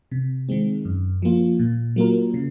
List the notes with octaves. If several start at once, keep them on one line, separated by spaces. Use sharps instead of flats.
C3
D#3 G#3 C4
F#2
F3 A#3 F4
A#2
F#3 A#3 F4 A#4
C#3